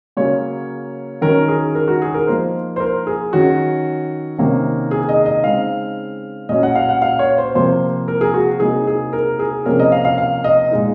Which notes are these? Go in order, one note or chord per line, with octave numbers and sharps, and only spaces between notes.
C#3 F#3 A#3 C#4 C#5
D#3 F#3 C#4 A#4
G#4
A#4
F#4
G#4
A#4
F3 A#3 D#4 C5
C5
A#4
G#4
D#3 F#3 C#4 F#4
C3 D#3 A#3 C#4
G#4
D#5
D#5
C#3 G#3 C4 D#4 F5
A#2 F#3 C#4 D#5
F#5
F5
F#5
F5
C#5
C5
C3 F3 A#3 C5
A#4
G#4
F#4
C3 F#3 A#3 D#4 G#4
G#4
A#4
G#4
C3 F3 A#3 C#4 A#4
D#5
F5
F5
F5
D#5
A#2 G#3 D#4